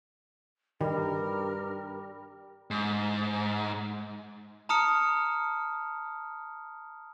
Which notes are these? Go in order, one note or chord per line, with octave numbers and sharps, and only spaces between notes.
G2 D#3 G3 A#4
G#2
A5 A#5 D#6 F6 C#7